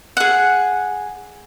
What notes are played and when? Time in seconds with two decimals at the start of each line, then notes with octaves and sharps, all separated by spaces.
0.17 G#4 F#5